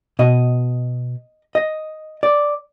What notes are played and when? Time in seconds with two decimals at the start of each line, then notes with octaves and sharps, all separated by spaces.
0.19 B2 D#5
1.55 D#5
2.23 D5